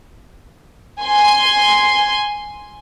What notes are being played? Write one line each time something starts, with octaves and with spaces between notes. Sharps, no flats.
G#5 C6